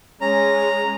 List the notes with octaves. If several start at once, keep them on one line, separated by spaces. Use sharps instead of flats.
G#3 C#4 A#5